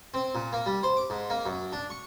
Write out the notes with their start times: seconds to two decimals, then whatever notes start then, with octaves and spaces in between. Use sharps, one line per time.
0.14 C4
0.35 A#2
0.53 A#3
0.66 G3
0.83 C5
0.97 D6
1.10 G#2
1.30 A#3
1.46 F#2
1.73 D4
1.90 C#6